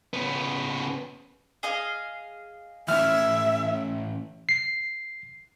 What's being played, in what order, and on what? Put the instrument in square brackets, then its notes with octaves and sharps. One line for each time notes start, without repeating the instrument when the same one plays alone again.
[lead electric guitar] C#3 B3
[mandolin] G#4 D#5 F5
[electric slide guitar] E3 A3 C#4 [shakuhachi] E5 [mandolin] F6
[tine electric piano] C7